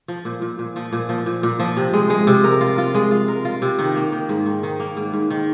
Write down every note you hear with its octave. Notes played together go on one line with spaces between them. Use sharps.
F3
A#2
A#2
A#2
F3
A#2
F3
A#2
A#2
F3
C3
G#3
G#3
C3
A#4
F4
F4
G#3
F4
A#4
F4
C3
D#3
A#3
D#3
G#2
D#3
D#3
A#3
G#2
G#2
D#3